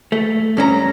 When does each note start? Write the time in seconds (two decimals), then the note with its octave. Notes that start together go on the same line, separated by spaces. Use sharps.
0.12 A3
0.57 G2 C#4 A4 A#5